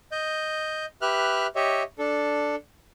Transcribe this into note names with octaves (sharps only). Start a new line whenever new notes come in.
D#5 G6
G4 B4 E5 F6 F#6
G4 C#5 D#5 E5
D4 A4